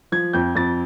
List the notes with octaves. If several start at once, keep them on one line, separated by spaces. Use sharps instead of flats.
F3 G#6
F2 G6
F2 A6